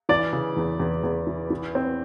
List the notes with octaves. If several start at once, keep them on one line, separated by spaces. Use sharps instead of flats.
E3 D5
C#3
E2
E2
E2
E3
E3
C4